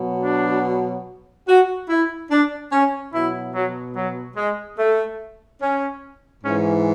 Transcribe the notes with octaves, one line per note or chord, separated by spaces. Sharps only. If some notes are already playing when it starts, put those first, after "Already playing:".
Already playing: B2 F#3
D4
F#4
E4
D4
C#4
B2 F#3 E4
F#3
F#3
G#3
A3
C#4
G#2 E3 C#4